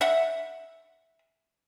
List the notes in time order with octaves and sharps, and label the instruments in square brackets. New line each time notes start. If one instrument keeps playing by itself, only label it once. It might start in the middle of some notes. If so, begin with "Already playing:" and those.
[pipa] E5 F#5